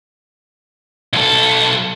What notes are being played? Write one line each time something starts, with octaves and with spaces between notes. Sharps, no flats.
B1 A4